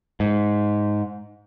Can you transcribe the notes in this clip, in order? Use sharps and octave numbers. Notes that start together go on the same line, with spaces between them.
G#2